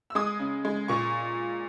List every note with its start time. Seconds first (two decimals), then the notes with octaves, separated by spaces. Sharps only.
0.10 E6
0.15 G#3 D#6
0.39 C#3
0.65 G#3
0.88 A#2 C#6